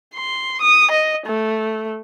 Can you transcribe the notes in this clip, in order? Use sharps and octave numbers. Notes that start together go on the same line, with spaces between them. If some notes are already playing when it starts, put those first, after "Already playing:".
C6
D#6
D#5
A3